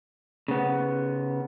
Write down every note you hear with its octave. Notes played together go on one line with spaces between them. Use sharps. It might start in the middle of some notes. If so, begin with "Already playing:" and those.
C#3 B3